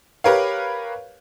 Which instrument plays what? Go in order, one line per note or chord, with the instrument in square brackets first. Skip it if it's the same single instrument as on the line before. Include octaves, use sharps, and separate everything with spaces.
[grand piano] G4 A#4 B4 C#5 F5